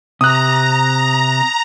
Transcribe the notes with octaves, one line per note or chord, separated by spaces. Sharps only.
C3 A#5 D#6 F#6